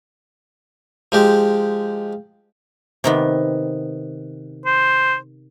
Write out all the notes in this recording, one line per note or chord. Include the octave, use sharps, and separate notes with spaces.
F3 G#3 G4
C3 D#3 B3
C5